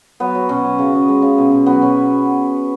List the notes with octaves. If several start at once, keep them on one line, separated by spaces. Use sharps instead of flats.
F#3 B3
F#3
B2 C#4
F#3
C#3
C#3
G#3
C#3
B2
B2
F#3 B3
B2 C#4